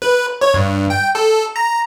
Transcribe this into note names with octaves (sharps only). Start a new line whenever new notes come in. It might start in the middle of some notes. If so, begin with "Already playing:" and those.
B4
C#5
G2
G5
A4
A#5